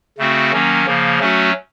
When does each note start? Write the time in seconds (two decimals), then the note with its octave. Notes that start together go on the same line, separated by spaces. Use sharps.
0.18 C#3 A3 C4 F#4
0.52 D#3 F#3 A#3 C#4
0.86 C#3 F3 A#3
1.19 F#3 A3 C#4 F#4